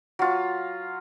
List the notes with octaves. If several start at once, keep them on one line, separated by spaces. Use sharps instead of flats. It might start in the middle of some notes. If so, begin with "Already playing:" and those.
F#3 F4